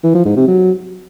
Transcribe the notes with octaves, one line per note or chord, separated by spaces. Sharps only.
E3
F3
G#2
C3
F#3